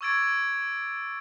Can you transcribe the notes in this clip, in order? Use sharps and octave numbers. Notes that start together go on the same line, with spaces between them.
C#6 D6 E6 G#6 A6 D7